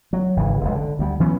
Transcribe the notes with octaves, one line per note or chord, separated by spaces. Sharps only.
F#3
G#1 C#3 E3
F1 C#2
D3
D2 G3
E3 F#3 B3 C#4